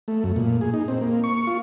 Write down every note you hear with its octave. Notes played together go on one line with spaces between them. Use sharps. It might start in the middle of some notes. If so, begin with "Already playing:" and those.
A3
F#2
A#2
G#4
D#4
C4
A#3
C#6
F4